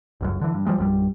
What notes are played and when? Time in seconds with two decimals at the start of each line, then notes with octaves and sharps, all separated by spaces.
0.21 G1 C#2 F#2
0.41 D3 E3
0.54 G2
0.67 F3 G3 G#3
0.78 A#1 F#2 D3 G3